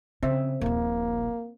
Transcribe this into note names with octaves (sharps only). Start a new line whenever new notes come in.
C#3 C4 E5
D#1 A#1 A#3